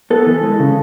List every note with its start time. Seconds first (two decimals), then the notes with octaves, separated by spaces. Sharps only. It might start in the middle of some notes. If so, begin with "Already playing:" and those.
0.10 B3 A4
0.27 E3
0.43 G#3
0.59 C#3